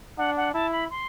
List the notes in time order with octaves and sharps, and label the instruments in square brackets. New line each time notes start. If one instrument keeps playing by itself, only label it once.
[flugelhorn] D4 [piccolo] F#5
[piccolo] F#5
[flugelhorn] E4 [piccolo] A5
[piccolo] B5
C6